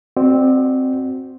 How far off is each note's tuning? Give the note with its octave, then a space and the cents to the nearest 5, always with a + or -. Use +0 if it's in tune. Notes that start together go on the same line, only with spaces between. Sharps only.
C4 +0 F#4 +0 D5 +35